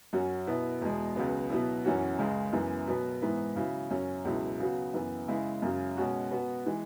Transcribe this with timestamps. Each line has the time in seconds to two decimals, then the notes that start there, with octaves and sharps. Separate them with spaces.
0.13 F#2 F#3 C#4 F#4
0.47 B2 B3 E4
0.82 E2 B2 G#3
1.16 C#2 C#3 F#3 B3
1.50 B2 F#3 B3 E4
1.84 F#2 E3 C#4 F#4
2.19 C#2 C#3 G#3
2.53 F#2 E3 B3
2.87 B2 F#3 B3
3.22 G#2 E3 B3 E4
3.56 C#3 F#3 E4
3.90 F#2 F#3 C#4
4.25 C#2 B2 F#3 E4
4.60 C#3 F#3 B3 F#4
4.94 F#2 E3 B3
5.28 C#3 G#3 E4
5.62 F#2 C#3 F#3
5.97 B2 G#3 C#4 F#4
6.31 B2 B3 F#4
6.66 E3 G#3